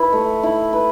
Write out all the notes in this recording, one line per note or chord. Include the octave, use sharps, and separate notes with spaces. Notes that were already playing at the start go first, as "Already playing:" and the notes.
Already playing: E4 B4
A3
E4
B4